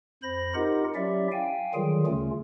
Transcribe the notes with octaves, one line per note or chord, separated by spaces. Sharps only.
F2 C5 B5 A#6
D#4 F4 G4 A#4 D#5 F#5
F#3 C#4 E4 G4 D5 E5
F5 G5 G#5
D3 D#3 F#3 G3 F4 G#4
D2 C#3 A3 C#4 F4